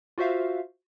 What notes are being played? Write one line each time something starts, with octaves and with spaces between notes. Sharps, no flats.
F4 F#4 C5 E5 F5